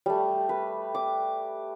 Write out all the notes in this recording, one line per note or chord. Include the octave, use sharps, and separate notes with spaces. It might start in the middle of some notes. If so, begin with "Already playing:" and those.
G3 A3
B4
D6